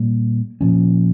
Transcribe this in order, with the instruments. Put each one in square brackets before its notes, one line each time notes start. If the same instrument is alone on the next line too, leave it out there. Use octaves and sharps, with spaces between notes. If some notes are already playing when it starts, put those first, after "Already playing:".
Already playing: [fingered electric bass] A#2 G3 A#3
A#2 F3 C#4